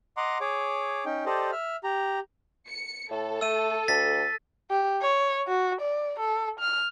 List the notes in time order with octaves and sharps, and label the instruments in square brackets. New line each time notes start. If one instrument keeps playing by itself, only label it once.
[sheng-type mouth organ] D#5 F#5 A#5 C6 D6
G#4 C#5 D6
C#4 D#4 G5
G4 A4 C5 D5 D#5
E5 F6
G4 A#5
[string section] C#7
[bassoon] A2 [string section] A4
[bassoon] A3 [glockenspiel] E6 D#7
[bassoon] D2 [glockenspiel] A6 B6
[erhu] G4
C#5
F#4
D5
A4
F6